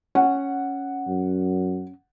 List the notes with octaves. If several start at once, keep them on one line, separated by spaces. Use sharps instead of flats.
C#4 F#5
F#2